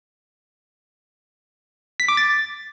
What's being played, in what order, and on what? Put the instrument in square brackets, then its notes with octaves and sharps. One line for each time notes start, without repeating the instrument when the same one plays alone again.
[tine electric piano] B6
D6
A6